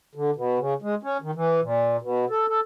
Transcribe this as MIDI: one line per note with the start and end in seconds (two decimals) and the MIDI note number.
0.15 0.31 50
0.36 0.59 47
0.59 0.74 49
0.82 0.95 56
1.03 1.17 61
1.22 1.31 51
1.35 1.60 52
1.62 1.97 46
2.01 2.25 47
2.30 2.47 69
2.48 2.60 69